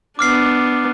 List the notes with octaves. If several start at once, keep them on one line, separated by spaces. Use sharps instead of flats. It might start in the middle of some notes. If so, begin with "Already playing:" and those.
B3 D4 D6 F6 C7